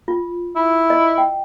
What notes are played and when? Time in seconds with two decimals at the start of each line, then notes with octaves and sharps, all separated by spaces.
0.08 F4
0.56 E4
0.90 D#5
1.18 G5